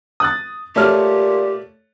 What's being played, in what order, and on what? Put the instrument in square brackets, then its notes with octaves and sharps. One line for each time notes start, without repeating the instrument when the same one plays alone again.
[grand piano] D#6 F#6 A6
[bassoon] A#2 [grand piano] A3 C#5 F6 [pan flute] G4